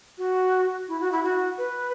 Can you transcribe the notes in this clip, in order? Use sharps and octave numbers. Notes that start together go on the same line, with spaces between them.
F#4
E4
F#4
E4
F#4
B4